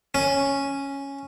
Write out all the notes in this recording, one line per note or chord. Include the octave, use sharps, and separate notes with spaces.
C#4